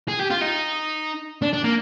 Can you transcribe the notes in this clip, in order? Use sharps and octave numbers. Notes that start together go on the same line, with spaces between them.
G#4
G4
F4
D#4
D4
D4
A#3